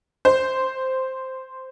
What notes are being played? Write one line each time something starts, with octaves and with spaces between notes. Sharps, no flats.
C5